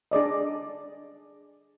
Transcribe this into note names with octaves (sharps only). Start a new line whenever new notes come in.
D4 G#4 D5 D#5